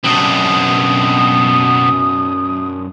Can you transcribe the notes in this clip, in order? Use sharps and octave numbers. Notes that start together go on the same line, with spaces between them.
F#2 B2 C4 D4 D#6